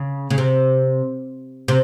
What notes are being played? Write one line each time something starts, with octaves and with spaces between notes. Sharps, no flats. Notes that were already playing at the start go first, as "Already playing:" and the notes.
Already playing: C#3
C#3
C3
C3